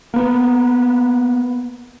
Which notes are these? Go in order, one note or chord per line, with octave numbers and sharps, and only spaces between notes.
A#3 B3